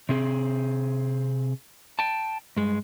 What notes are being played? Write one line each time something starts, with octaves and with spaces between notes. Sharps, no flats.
C3 C4 G#4
G5 A5
G2 G#3